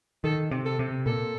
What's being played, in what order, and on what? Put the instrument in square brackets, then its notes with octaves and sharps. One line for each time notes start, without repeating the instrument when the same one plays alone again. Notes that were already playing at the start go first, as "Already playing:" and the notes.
[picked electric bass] D#3 [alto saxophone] A4
[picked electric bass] C3
[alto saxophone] A4
[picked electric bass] C3
[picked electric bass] A#2 [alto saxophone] A4